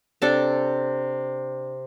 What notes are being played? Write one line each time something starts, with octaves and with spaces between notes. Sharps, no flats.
C3 D4 A4